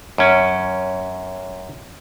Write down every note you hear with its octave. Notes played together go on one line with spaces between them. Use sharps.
F#2 C#4